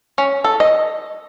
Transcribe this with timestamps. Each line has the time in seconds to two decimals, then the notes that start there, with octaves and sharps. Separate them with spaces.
0.18 C#4
0.44 A4
0.60 D#5